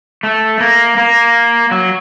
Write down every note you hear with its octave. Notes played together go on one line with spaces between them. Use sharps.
A3
A#3
A#3
F#3